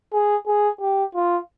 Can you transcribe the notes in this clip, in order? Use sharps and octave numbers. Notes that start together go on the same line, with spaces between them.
G#4
G#4
G4
F4